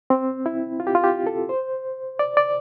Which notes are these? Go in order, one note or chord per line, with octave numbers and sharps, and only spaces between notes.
C4
E4
F4
G4
F4
G4
A4
C5
D5
D5